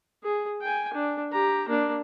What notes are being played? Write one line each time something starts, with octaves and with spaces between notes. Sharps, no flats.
G#4
G5 G#5
D4
G4 A#5
A#3 D4